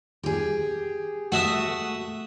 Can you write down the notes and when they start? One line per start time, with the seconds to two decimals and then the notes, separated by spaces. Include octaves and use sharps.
0.23 G4 G#4
1.32 A3 F#4 E5 D#6